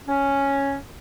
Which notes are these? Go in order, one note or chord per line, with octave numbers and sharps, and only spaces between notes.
C#4